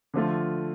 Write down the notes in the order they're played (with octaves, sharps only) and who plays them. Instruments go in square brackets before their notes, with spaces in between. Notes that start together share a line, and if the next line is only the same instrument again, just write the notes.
[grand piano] D3 F3 A3 F4